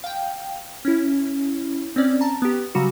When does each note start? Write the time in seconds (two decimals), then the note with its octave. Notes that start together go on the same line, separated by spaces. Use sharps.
0.04 F5 G5
0.85 C#4 E4
1.96 C4 C#4 D5
2.21 A5 A#5
2.42 B3 G4
2.75 C#3 F#3 G3 F#4